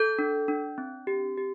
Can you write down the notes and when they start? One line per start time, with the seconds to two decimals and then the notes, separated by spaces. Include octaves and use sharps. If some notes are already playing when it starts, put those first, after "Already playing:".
Already playing: A4 G6
0.19 D4
0.48 D4
0.78 C4
1.07 G4
1.37 G4